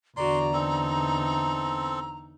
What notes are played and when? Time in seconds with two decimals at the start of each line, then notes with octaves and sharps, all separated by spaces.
0.17 E2 D3 F#4 D5 A#5 C6
0.53 C4 D#4 A4